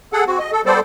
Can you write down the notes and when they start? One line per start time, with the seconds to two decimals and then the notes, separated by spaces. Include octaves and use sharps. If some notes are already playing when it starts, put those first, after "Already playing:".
0.13 G#4 A4 F#5
0.27 C4 F#4
0.39 D#5
0.52 A4
0.66 G3 B3 A4 C5 D5